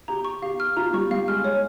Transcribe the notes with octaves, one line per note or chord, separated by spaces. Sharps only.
G4 A#5
C#6
G4 F5
F6
F4 A#5
G3 C#6
G3 F5
G#3 F6
G#3 C#5